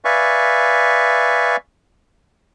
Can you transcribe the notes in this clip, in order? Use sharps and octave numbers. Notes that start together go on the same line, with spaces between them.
B4 D5 E5 F5 G#5 C#6